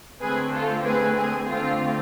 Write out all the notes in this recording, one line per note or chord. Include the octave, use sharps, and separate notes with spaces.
D3 A3 C4 G#4 B4
F4 A4
G#4 B4
G#4
D3 A3 C4 F4